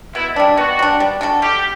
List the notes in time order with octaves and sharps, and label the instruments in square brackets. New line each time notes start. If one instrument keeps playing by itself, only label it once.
[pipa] B2 [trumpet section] E4
[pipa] G3 D4
[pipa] B2 [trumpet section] F#4
[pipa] G3 D4
G3
D4 F#4 A4
[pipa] G3 [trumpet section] G4